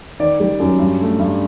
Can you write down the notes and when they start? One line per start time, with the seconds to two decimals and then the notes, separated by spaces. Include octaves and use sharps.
0.20 D#3 D5
0.40 G3
0.60 F#2
0.80 G2
1.01 A3
1.20 G2